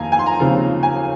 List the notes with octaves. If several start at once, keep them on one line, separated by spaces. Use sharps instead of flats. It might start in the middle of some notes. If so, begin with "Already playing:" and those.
Already playing: F2 D#3 A#3 D#4 G#5 A#5
G#5
C6
A#5
D#2 C#3 F3 C4 F4
G#5